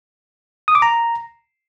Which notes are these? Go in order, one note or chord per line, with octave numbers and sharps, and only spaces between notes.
D#6
D6
A#5